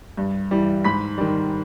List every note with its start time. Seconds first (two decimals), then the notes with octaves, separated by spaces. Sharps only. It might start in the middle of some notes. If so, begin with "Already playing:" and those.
0.17 G2
0.51 E3 G3
0.84 G#2 B5 B6
1.18 D#3 G3